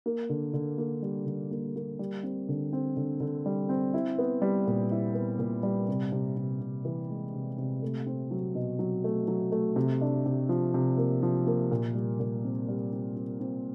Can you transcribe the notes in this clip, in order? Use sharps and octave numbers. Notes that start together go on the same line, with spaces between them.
A#3
D3
D3
A#3
G3
D3
A#3
A#3
G3
C4
D3
C4
D3
D3
G3
C4
E4
B3
G3
A#2
E4
B3
A#2
G3
C3
C3
C3
C3
E3
G#3
C3
C3
A3
C4
F#3
B2
F#3
A3
F#3
A3
C3
D4
C3
F3
C3
A#3
F3
A#3
A#2
G3
A#2
C4
G3
C4
C4
C4